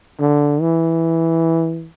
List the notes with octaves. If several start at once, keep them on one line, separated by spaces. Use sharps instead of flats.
D3
E3